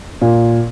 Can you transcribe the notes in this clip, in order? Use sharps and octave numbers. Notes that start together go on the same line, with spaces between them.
A#2